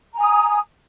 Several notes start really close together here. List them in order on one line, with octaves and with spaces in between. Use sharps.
A#5 G#5 D#6